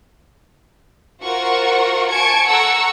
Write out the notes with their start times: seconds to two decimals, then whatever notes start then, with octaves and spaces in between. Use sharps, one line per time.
1.23 F4 F#4 A#4 C5 F#5 C#6
2.12 G#5 A5 C#6 G#6 C#7 D7
2.49 A4 F#5 A#5 C#6 E6 C#7